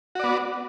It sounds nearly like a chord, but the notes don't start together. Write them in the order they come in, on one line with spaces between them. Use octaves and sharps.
F#4 D5 B3